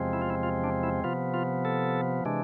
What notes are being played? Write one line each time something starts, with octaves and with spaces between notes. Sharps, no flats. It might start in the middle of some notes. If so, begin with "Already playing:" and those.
Already playing: E2 C3 F3 G#3 C4
E4
F4
E4
F4
D4
E4
C3 F3 B3 F4
F4
A4
C3 E3 G#3 D4